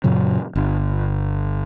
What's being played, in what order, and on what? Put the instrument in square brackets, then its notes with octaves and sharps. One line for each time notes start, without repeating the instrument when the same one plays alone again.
[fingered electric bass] F#2 A#2 C#3 F#3
G1